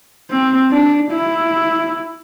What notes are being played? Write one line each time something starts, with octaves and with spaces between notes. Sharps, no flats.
C4
D4
E4